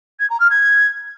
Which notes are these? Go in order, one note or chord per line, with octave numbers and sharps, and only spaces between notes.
G#6
A#5
F6
G#6